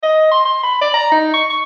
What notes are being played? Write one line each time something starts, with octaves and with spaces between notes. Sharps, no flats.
D#5
C6
C6
B5
D5
A#5
D#4
C#6
C#6